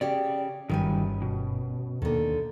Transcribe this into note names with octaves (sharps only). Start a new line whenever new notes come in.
C#3 G4 D5
G1 F#2 D#3 G3 B4 G#5
B2
D#2 D3 D#3 A#3